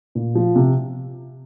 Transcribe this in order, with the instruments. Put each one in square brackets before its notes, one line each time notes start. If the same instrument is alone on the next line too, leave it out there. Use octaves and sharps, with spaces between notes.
[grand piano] A#2
F3
C3